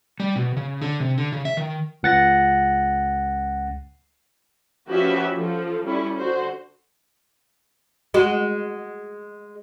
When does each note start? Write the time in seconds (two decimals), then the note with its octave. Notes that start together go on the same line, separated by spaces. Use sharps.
0.20 G3
0.36 B2
0.57 C#3
0.82 D3
1.00 C3
1.18 D3
1.32 C#3
1.45 E5
1.57 D#3
2.03 C#2 F#5 A6 A#6
4.90 F3 C#4 F#4 G4 B4 E5
5.34 F3 A4
5.84 G3 C#4 E4 A4
6.16 D3 F#4 C5
8.14 G#3 F#4